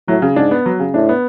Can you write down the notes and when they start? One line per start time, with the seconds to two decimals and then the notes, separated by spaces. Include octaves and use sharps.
0.08 A2 F#3
0.22 C#3
0.36 G#2 D4
0.51 B3
0.66 F#3
0.80 C#3
0.94 A2 D4
1.09 B3